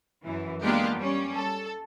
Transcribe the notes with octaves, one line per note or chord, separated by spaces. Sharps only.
F#2 E3
G#3 A#3 B3 D4 F4 G4
G3 C#4
A4